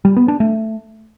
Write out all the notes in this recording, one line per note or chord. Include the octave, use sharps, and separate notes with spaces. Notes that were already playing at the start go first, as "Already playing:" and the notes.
G3
B3
D4
A3